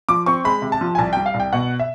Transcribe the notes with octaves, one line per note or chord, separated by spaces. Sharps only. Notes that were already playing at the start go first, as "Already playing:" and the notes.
F3 D6
C4 C#6
G#3 B5
C3
A5
F3
G#5
C2 A5
G3 G5
F5
C2
G5
B2 F#5
E5